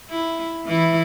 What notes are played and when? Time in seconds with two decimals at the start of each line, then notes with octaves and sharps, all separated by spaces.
0.10 E4
0.66 E3 E4